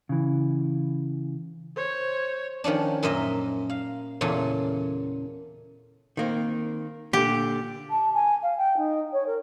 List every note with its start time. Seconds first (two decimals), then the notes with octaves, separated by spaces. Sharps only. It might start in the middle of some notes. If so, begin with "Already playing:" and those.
0.09 C#3 E3
1.76 C5 C#5
2.64 D#3 F3 C#4 D4
3.03 F#2 A#2 A#4 D#5 E5
3.70 F5
4.21 E2 A#2 C#3 A4 G#5
6.17 D#3 A#3 C4
7.13 A#2 D3 G4
7.90 A5
8.14 G#5
8.42 F5
8.57 G5
8.77 D#4
9.12 C#5
9.26 A#4